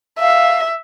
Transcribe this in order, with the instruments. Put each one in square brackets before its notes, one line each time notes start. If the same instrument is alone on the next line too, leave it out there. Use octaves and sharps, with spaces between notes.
[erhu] E5 [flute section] F5